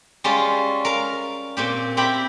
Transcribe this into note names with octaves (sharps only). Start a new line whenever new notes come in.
G3 G#3 C#4 F4
A#4 F5
A#2 C4 G4
C4 E4 G4 G5 B5